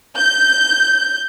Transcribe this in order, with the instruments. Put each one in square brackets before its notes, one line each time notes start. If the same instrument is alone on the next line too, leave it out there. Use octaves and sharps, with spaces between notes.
[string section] G6